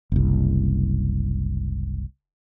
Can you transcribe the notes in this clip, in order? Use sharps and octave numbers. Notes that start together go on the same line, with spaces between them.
F#1 C2